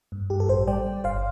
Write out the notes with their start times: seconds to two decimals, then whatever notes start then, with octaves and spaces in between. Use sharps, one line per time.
0.12 G2
0.30 G2 G4
0.40 A4
0.49 A1 G4 C5
0.67 G3 D5 G5
0.86 G3
1.04 G1 C5 F5